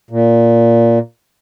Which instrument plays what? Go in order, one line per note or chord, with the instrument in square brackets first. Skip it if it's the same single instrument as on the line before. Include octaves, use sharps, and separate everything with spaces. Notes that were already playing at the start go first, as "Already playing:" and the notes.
[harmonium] A#2